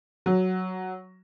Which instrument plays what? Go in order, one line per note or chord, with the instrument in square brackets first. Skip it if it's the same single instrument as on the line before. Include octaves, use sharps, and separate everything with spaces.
[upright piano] F#3